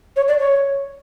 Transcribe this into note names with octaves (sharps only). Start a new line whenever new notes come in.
C#5
D5
C#5